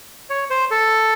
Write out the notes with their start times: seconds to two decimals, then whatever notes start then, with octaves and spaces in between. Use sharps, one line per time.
0.30 C#5
0.50 C5
0.71 A4